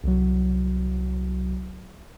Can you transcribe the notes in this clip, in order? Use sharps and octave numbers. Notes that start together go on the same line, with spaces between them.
C2 F#3